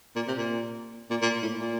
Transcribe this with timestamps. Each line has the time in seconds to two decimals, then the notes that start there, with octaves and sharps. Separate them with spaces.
0.16 A#2
0.27 C3
0.37 A#2
1.11 A#2
1.22 A#2
1.42 A2
1.58 A#2